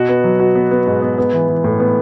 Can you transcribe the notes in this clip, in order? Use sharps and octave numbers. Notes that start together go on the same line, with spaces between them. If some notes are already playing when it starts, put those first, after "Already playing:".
Already playing: B2 F#4
B3
F#3
F#4
B3
B3
G#2
B3
B3
E3
E3
A2
B3